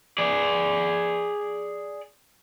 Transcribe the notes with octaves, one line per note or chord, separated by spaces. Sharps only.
G#4 D5